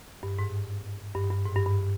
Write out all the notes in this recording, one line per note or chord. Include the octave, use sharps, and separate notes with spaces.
G2
G#2
G2
G2
G#2
G2
G2